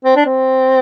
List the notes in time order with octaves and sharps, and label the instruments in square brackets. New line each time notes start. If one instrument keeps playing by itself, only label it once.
[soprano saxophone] C4
D4
C4